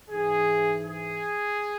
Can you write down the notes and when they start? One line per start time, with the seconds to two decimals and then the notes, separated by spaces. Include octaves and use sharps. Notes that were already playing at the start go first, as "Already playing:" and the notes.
0.10 G#2 E3 G#4
0.81 G#4